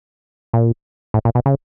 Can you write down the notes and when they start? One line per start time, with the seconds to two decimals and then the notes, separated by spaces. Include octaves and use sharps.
0.53 A#2
1.14 A2
1.25 A#2
1.35 B2
1.46 C#3